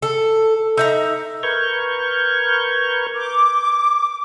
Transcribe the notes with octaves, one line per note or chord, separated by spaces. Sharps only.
A4
D#4 E5 A#5
A#4 B4 C#6 F6 G6 G#6
D6